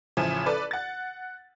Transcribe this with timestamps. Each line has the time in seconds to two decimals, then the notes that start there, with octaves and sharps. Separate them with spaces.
0.17 A1 C#3 E3 F3 G#5
0.46 A4 B4 D5
0.71 F#5 A6